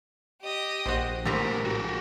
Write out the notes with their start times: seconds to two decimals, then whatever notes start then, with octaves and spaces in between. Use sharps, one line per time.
0.42 G4 D#5
0.86 A#1 F#4 C5
1.25 A2 G3 C4 G4 A#4 A#5
1.65 F#4 G4